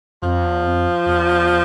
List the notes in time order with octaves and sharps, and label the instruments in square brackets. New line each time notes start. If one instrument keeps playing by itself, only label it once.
[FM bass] F2 [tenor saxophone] F3
[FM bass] E2
F2
E2